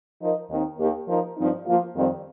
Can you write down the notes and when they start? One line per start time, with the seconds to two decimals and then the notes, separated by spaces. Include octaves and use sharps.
0.19 F3 D#4 A#4 D#5
0.49 D#2 D#3 C4 D#4
0.77 D#2 D#3 A#3 G4 A#4
1.07 F3 D#4 A#4
1.37 G2 F3 C4 D#4
1.66 F3 A#3 F4
1.95 F2 D#3 G3 C4